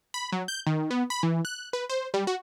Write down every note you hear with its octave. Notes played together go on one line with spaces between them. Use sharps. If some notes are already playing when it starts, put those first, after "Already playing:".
B5
F#3
G6
D#3
B3
B5
E3
F#6
B4
C5
G3
F#4